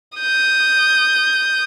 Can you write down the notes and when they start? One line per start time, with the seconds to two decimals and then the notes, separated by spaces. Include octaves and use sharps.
0.18 D#6 G6